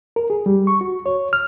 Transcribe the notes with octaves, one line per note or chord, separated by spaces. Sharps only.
A#4
G#4
G3
C#6
F#4
C#5
F6